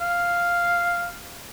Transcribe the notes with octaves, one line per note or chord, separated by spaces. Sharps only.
F5